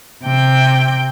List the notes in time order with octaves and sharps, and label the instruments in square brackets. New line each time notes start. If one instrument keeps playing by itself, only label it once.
[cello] C3 G5